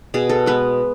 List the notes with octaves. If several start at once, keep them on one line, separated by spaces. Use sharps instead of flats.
B2 G#4
A4
G#3 B3 B4